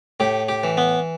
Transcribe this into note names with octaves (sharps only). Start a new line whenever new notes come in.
A2 G4
G4
E3
B3